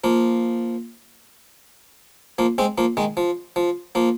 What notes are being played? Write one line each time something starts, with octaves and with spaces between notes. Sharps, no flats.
F3 A#3
F3 A#3
G#3 C4
F3 A#3
D#3 G#3
F3
F3
F3 A#3